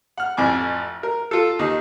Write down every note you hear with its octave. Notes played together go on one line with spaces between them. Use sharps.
F#5 F6
A1 F2 G#5 D6
A#4
F4 A4
D#2 D#4